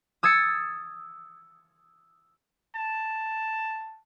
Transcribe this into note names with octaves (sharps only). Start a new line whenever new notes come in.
D#6 E6 G#6 A6 C#7
A5